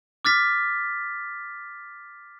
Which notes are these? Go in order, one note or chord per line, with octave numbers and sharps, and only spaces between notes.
D6 F6 A6 B6